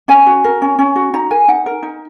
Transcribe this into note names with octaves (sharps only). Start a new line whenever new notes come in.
C#4 G#5
F#4
A#4
C#4
C#4
F#4
D#4 A#5
A#4 G#5
D#4 F#5
A#4
D#4